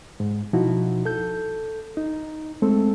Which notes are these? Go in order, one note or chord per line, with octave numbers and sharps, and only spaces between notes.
G#2
B2 F3 D#4 E4 F#4
A4 G6
D#4
G#3 A3 C4 A4